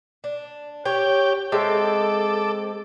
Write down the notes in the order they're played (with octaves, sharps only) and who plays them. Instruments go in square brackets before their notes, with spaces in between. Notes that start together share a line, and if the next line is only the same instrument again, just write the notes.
[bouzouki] D4
[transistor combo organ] G4 G5 [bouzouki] C#5
[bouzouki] G#3 C4 E5 [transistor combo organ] A4 D6